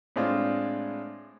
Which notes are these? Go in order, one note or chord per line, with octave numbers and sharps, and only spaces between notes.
A2 G#3 C4 D4 F4